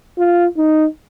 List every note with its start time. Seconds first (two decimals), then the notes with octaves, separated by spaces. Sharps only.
0.18 F4
0.57 D#4